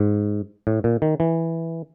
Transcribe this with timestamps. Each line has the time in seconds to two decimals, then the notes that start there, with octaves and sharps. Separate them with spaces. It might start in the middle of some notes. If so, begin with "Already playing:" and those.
Already playing: G#2
0.67 A2
0.84 A#2
1.02 D#3
1.20 E3